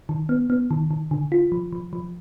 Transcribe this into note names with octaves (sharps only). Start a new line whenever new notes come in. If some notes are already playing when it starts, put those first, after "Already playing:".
D#3
B3
B3
D#3
D#3
D3
F4
F3
F3
F3